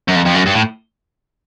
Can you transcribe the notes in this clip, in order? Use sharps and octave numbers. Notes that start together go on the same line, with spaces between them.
F#2
F2
F2
F#2
G2
A2